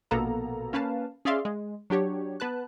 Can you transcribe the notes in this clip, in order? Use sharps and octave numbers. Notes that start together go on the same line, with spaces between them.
A#1 B2 A#3 B3 A4 A#5
A#3 C#4 B4 F5 A5
C#4 G#4 D5 E5 F5 C6
G#3
F#3 D4 G4 C#5
B3 B4 A5 F#6